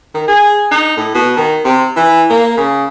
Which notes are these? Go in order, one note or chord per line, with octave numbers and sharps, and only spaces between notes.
D#3
G#4
D#4
A2
B2
D#3
C3
E3
A#3
C#3